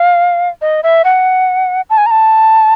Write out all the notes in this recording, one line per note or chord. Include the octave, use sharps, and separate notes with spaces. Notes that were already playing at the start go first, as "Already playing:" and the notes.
Already playing: F5
D#5
E5
F#5
A5
G#5
A#5
A5